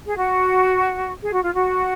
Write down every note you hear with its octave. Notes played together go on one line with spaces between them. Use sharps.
G#4
F#4
G#4
F#4
F4
F#4